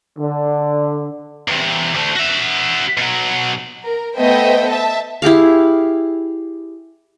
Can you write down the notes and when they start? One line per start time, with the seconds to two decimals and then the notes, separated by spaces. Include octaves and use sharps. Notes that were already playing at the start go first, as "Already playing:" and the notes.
0.19 D3
1.48 E2 C3
1.95 D2 A3
2.17 F#4 E5
2.97 B2 F#3
3.86 A#4
4.16 A3 B3 C5 D#5 E5 G5
4.68 E5 A5
5.22 E4 G4 G#4 F5